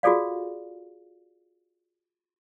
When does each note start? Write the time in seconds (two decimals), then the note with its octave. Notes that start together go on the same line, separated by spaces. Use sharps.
0.03 F4 F#4 G#4 A4 D5 F5